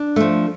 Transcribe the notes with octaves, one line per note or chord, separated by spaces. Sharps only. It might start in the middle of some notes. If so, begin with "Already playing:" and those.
Already playing: D4
F3 A3